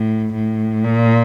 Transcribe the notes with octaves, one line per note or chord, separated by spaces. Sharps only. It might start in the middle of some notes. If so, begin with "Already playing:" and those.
Already playing: A2
A2
A#2